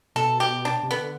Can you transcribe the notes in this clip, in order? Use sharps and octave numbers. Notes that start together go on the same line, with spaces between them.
B2 A4
G4
D4
C3
D3 B3